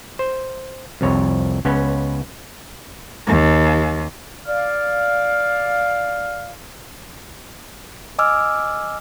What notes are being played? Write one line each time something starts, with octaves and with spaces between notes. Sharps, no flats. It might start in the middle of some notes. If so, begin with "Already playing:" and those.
C5
C2 F2 C#5
C#2 B3 C#4
D#2
D5 F5
D#5 G#5 D6 E6 F6